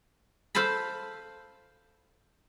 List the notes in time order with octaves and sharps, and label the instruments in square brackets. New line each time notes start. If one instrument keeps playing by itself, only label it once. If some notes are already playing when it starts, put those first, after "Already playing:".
[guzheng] A4 C5 F5 A5 B5